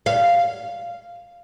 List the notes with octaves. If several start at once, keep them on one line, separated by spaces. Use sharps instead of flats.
F5